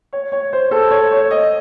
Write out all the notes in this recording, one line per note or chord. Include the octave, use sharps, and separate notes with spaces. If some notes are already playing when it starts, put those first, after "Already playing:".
C#5
C#5
C5
A4
C#5
C#5
D#5